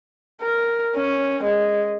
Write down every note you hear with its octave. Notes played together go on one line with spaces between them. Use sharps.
A#4
C#4
G#3